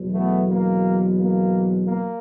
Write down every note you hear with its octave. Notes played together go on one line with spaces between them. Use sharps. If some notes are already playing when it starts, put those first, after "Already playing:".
Already playing: E2 B2 F#3
A3 B3
A#3
A#3
A#3